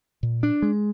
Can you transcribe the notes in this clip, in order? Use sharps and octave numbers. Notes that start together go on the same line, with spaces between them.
A#2
D4
G#3